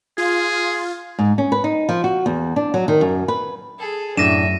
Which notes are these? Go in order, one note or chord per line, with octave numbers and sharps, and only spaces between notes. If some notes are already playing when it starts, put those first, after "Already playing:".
F4 G#4
G#2
C#4
B4
D#4
F3
F#4
E2
D4
F#3
D#3
F#2
B4
G#4 A4
F#2 A2 D4 E5 A#6 D#7 E7